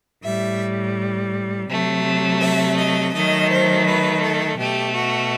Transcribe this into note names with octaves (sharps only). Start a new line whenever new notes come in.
A2 G3 E5
C3 F#3 A3
E5
D#5
D#3 F#3 A3 D#5
C5
B4
A4
B2 A3 G4
F#4